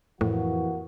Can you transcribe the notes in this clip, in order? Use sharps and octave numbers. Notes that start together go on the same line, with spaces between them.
F2 A2 C3 E3 A#3 F#4